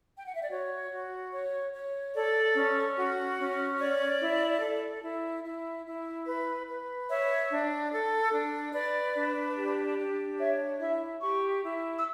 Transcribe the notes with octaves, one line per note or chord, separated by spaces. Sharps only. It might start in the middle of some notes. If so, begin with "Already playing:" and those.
G5
F#5
E5
D5
F#4 C#5
F#4
C#5
C#5
A4 D5
C#4
F#4
C#4
C#5 D5
E4
A4
E4
E4
E4
B4
B4
C#5 E5
D4
A4
D4
B4 D5
D4
G4
D4
C#5 E5
E4 E5
G4 C#6
E4
E6